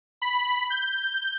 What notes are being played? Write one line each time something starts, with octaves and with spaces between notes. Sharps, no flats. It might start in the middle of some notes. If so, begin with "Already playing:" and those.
B5
G6